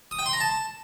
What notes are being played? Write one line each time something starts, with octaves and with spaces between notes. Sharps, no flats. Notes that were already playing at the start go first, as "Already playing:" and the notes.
D#6
G5
C6
A#5
A5